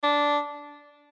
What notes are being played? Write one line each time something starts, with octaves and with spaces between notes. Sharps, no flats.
D4